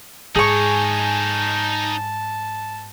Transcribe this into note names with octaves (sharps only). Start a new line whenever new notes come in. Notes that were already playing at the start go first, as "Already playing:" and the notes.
G#2 D#4 G#4 C#5 A5 C#6